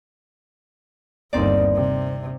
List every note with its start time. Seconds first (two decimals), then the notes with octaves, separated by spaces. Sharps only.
1.33 G1 D#2 C4 D#4 D5
1.75 C3